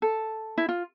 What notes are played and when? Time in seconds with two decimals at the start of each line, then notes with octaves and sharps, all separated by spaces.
0.02 A4
0.58 E4
0.69 F4